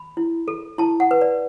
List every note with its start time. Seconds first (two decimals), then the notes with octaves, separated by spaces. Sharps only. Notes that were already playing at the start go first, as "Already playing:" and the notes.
Already playing: B5
0.17 E4
0.48 A4
0.78 E4 A5
1.00 F#5
1.11 B4
1.21 D5